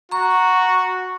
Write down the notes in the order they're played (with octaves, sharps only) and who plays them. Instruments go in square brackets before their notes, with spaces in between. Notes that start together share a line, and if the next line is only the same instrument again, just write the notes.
[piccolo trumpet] F#4 [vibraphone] A#5 C#6